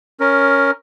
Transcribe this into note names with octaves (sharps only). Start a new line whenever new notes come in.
C#4 A#4